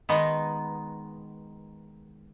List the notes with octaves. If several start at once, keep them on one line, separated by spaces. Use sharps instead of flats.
D#3 G#3 B3 D#4